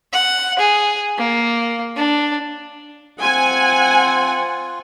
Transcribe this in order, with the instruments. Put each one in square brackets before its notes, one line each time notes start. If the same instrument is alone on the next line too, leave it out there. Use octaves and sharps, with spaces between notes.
[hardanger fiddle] F#5
G#4
A#3
D4
[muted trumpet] C4 [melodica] F4 [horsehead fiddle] F#5 [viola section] G#5